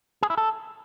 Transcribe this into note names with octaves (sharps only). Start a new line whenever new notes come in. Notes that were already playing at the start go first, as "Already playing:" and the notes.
G#4
E4
A4